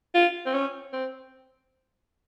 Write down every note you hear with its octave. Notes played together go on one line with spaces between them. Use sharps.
F4
C4
C#4
C4